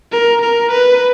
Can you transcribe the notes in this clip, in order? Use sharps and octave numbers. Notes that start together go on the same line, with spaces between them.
A#4
A#4
B4